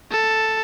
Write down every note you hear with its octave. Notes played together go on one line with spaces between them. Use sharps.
A4